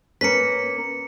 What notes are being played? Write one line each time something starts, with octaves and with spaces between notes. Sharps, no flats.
A#3 C#4 B4 B6 C#7